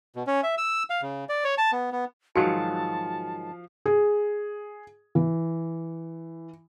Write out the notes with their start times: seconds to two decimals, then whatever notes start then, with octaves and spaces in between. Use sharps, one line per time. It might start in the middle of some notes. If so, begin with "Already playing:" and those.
0.16 B2
0.27 C#4
0.43 E5
0.58 E6
0.90 F5
1.02 C#3
1.29 D5
1.44 C#5
1.58 A5
1.72 B3
1.92 B3
2.36 G#2 D#3 F3 F#3 F#4 F5 A5 C#7
3.86 G#4
5.15 E3